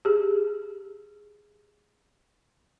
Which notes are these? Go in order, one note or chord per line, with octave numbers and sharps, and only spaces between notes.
G4 G#4